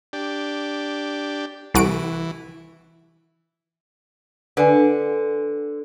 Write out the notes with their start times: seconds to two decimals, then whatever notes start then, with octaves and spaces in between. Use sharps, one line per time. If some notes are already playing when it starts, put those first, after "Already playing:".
0.13 D4 G4
1.74 C2 E3 F#4 D7
4.57 D3 B4 D5 G#5